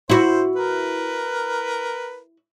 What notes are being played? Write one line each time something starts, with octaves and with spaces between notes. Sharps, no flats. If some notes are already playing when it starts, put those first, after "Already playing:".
E4 F#4 C5
A#4 B4